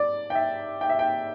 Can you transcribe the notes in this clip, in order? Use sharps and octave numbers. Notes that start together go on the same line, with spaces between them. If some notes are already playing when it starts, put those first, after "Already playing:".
Already playing: D5
G5
E5
G5
E5
G5